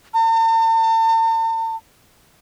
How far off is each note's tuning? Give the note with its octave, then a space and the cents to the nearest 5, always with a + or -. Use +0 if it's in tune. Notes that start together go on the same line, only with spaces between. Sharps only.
A5 +45